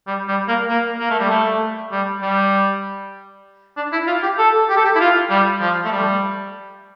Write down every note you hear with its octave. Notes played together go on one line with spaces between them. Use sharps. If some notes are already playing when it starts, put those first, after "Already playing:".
G3
G3
A#3
A#3
A#3
A3
G3
A3
G3
G3
D4
E4
F4
G4
A4
G4
A4
G4
E4
F4
G3
F3
A3
G3